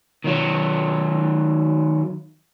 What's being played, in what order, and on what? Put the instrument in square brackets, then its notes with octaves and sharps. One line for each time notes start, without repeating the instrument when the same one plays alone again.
[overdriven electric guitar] D#3 F#3